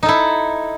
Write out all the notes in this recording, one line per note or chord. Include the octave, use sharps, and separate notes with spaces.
D#4 E4 A4